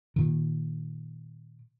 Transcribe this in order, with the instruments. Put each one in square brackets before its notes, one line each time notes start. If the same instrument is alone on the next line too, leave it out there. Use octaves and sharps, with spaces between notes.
[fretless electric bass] A#2 D#3